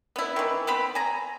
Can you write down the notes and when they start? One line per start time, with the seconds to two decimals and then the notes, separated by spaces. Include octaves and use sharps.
0.16 B3 E4
0.36 D#3 E3
0.67 B3 C4 B5
0.95 G#5 A#5